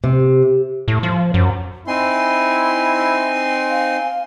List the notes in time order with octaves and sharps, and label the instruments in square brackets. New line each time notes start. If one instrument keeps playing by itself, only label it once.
[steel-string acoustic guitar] C3
[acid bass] A2
F3
F#2
[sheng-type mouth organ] C4 D#4 C6 [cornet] E4 [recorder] G#5
[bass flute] F5